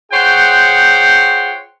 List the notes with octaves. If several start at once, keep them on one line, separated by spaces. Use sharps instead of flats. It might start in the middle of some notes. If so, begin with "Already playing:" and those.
F4 G#4 C5 C#5 F#5 G5